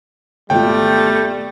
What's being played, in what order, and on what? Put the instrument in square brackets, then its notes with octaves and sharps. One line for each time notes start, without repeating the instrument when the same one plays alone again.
[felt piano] G#1 B2 F4 [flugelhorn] G3 [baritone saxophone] A3 [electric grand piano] G5